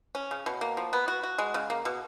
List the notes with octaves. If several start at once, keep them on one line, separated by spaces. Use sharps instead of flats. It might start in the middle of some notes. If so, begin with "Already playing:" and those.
C#4
C#3
B2
A#3
F3
B3
F#4
F#4
G#3
C#3
A#3
B2